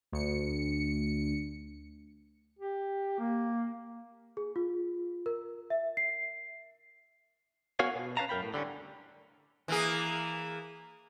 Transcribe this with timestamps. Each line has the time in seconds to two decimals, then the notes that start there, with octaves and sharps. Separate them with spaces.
0.12 D2 C#7
2.59 G4
3.19 A#3
4.37 G#4
4.56 F4
5.26 A#4
5.70 E5
5.97 C7
7.79 B3 F#4 A#4 C#5 F5 G#5
7.96 B2
8.17 C#4 B4 C#5 F5 A5 A#5
8.29 F#2 A#4 G5 B5
8.42 A2
8.54 D3 G3 C4 C#4
9.68 E3 A#3 G#4